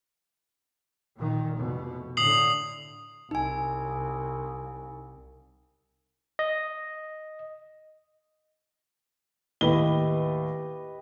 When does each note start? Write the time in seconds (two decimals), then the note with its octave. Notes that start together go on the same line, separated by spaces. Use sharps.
1.17 A#2 D#3
1.57 F1 B2
2.17 A2 D3 D#6 C7 F#7
3.31 C2 D#4 G#5
6.39 D#5
9.61 D#2 A2 G4 B4 D#5 G7